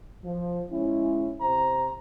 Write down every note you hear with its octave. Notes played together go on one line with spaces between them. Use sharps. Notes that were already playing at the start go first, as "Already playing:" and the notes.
F3
G#3 C#4 E4
C3 C5 A#5